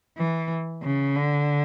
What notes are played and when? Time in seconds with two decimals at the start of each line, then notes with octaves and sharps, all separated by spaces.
0.17 E3
0.83 C#3
1.16 D3